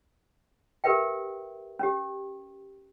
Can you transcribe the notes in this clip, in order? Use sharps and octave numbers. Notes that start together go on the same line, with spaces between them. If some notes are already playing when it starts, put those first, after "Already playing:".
G4 A#4 B4 E5 G5
C#4 G4